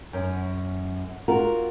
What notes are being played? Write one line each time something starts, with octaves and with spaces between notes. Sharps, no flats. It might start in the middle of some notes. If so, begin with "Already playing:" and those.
F#2
F4 F#4 A#4